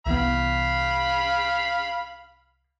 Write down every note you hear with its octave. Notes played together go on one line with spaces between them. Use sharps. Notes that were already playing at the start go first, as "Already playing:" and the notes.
C2 E3 B3 F5 B5